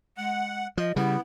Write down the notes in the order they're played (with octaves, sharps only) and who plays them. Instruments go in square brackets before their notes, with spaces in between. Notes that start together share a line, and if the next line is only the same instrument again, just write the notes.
[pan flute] G#3 [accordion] F#5
[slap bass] F3 [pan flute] D#5
[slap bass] C#3 G3 [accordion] B3 [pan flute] E4